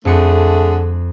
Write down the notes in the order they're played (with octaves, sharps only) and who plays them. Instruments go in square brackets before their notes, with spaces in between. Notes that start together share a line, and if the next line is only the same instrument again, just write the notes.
[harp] F2 C#7 [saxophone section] D3 A3 G#4